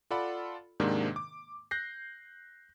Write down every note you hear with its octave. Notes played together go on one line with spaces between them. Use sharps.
F4 A4 D5 F#5 B5
G#2 C3 D#3 G#3 A#3 D4
D6
F#6 G6 A#6 C7